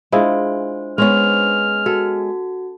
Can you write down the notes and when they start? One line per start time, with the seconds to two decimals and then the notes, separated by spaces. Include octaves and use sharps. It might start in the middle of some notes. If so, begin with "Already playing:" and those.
0.13 G#3 D4 E4 F4 C5
0.98 G#3 B3 C#4 C#5 F6
1.86 F#4 A4